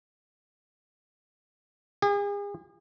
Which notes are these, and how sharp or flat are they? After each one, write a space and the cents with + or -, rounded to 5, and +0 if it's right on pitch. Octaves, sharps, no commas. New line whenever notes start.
G#4 -40